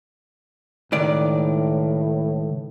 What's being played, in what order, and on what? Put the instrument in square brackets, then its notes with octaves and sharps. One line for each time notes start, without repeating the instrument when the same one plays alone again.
[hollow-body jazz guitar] C#2 D#3 D5 [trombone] A2